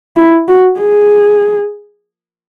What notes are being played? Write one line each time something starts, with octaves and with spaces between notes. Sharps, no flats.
E4
F#4
G#4